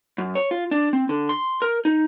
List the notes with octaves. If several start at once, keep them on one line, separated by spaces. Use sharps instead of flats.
F#2
C#5
F4
D4
C4
D3
C6
A#4
D#4